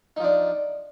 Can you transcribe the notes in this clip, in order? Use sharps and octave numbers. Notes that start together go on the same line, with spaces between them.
F3 D4 D#4